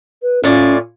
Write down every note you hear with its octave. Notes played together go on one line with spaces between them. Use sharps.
B4
A2 C#4 F4 D5 G#5